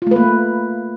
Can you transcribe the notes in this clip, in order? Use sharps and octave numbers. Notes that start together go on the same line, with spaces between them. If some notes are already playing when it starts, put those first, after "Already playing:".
A3 A#3 F4 B4